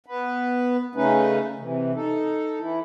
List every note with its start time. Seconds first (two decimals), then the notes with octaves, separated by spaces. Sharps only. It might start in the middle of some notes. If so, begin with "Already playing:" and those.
0.06 B3 B4
0.95 C#3 A3 C#4 D#4 B4
1.59 C3 E3
1.94 D#4 A4
2.59 E3 E4